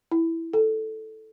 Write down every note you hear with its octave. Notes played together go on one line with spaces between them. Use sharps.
E4
A4